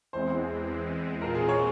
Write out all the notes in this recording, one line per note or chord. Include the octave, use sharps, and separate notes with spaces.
E2 E3 G#3 C4 C5
A#2 G#3 C4 F4 A#4
G#4
C#5